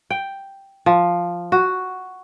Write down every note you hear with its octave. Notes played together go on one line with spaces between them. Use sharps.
G5
F3
F#4